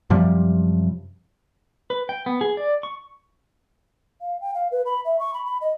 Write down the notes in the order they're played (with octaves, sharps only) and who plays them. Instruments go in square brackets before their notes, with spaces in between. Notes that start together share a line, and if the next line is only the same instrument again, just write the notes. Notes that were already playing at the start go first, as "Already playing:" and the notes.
[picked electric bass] F#2 C3 F3 G3
[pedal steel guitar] B4
G5
B3
G#4
D5
C#6
[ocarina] F5
G5
F5
B4
B5
E5
C#6
B5
B5
D#5